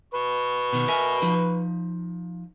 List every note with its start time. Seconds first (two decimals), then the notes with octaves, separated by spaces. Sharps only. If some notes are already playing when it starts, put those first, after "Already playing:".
0.14 B4 C#6
0.73 B2 D#3
0.88 A#4 E5 G#5
1.22 F3 D#4